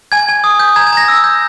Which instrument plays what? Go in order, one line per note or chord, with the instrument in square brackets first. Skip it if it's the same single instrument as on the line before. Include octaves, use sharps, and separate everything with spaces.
[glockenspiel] G#5 G#6
G#5
D#6
G6
A#5 G#6
G#6
A#5 A#6
E6
G6